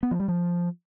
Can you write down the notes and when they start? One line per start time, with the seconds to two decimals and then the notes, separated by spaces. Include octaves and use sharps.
0.03 B3
0.11 F3
0.20 G3
0.28 F3